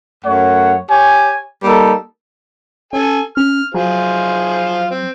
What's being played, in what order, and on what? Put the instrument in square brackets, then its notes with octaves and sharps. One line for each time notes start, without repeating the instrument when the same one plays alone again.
[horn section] F#2 A3 C#5 F#5
G4 C#5 G#5
G3 A#3 D#4 A4
[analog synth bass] C#4 [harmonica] A4 G#5
[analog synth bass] C#4 [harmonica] F6
[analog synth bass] F#3 [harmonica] F4 G#4 C5
[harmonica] C4